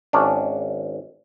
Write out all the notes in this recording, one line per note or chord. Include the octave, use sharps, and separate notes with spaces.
G#1 C#4 D4